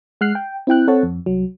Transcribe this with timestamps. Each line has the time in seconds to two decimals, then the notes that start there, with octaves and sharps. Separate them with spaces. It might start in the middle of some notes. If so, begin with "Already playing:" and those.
0.21 G#3 F#5 F6 F#6 C7
0.35 G5
0.67 C4 E4 G5 F#6
0.87 C4 A4 C#5 F#5 A5
1.03 F2
1.26 C2 F#3